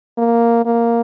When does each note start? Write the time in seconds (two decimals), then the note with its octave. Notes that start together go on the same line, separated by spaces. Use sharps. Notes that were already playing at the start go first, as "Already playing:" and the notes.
0.18 A#3
0.65 A#3